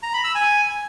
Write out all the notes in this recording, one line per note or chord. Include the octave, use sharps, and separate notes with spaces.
A#5
B5
E6
G#5